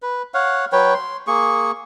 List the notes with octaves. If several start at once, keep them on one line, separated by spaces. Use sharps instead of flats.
B4
C#5 F5 F#5
F#3 B4 C#5 G5
C6
A#3 G#4 C#6